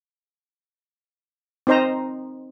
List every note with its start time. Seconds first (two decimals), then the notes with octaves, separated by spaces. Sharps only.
1.67 C4 D#4 C5 D#5 A#5